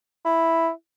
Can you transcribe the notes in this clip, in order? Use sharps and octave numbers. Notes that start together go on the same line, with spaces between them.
E4